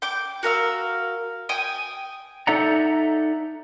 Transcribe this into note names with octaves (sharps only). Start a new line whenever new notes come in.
G5 D6
F#4 A#4 F5 E6
G5 G#5 D#6
D#4 A4 D5 E5 F#5 A#5